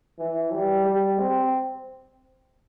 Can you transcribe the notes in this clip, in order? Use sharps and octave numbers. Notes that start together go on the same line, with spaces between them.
E3
G3
G3
C4